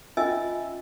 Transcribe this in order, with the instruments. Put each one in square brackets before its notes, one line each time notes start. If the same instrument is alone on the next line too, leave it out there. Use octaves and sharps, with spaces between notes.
[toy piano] C#4 F4 D#5 E5 G#5 E6